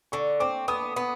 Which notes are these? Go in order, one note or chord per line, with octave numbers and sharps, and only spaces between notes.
D3 C#6
C4 D6
B3 D#6
B3